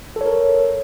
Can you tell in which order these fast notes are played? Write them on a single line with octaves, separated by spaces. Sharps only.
A4 C#5 A#4